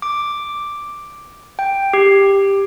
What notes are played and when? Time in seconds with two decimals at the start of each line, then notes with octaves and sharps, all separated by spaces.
0.02 D6
1.59 G5
1.93 G4